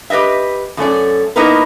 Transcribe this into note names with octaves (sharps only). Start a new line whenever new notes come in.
G4 B4 C5 D#5 E5
F#2 A3 C#4 D5
A#3 B3 D#4 E4 A#4 B4